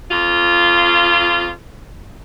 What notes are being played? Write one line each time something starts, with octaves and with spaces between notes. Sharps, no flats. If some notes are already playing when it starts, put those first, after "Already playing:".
F2 F4